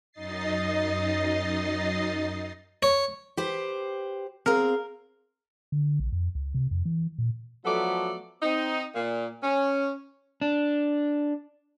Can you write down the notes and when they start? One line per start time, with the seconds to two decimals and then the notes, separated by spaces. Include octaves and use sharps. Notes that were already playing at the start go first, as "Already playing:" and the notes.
0.12 F#2 D#4 D#5 A6 C7
2.83 C#5
3.37 G4 B4 C5
4.46 C4 G#4 A#4 F5
5.72 D3
6.00 A#1
6.12 F2
6.35 C#2
6.54 C3
6.71 F2
6.85 E3
7.18 A#2
7.65 F3 F#3 A3 B3 A4 D5
8.42 C4 D#4
8.95 A#2
9.43 C#4
10.41 D4